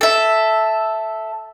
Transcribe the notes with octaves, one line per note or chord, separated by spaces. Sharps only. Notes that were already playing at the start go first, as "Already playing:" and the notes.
A4 E5